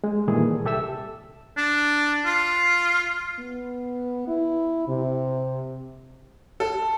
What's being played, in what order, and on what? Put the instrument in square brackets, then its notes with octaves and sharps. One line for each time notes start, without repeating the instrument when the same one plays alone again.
[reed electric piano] G#3
A#2 D#3 E3 G3 G#4 A4
C2 G4 A4 E5 E6
[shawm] D4
F4
[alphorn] B3
E4
C3
[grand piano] A4